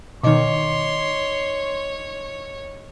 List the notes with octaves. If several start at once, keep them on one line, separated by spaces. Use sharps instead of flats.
B2 D#3 D#4 C#5 D#5 C6 D6